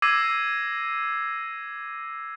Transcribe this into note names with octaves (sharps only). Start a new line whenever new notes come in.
D6 E6 G#6 A#6 C7 D#7